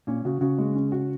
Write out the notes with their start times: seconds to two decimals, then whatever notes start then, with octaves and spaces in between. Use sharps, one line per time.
0.07 A#2 C#4
0.25 C#3 F#4
0.41 C#3 F#4
0.58 G#3
0.75 C#4
0.92 F#4